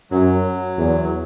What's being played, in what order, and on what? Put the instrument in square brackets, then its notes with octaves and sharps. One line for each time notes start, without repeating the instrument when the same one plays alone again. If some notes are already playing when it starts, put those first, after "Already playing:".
[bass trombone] F#2 [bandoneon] F#3
[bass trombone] E2